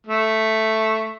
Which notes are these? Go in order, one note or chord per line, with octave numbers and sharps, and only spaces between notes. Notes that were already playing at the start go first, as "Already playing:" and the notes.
A3